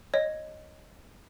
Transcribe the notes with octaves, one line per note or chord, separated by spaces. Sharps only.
C#5 D#5